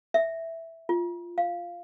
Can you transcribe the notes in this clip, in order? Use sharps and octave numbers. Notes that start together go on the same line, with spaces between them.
E5
F4
F5